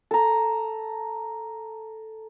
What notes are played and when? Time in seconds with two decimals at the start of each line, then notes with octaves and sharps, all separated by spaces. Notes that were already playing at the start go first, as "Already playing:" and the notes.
0.11 A4 A#5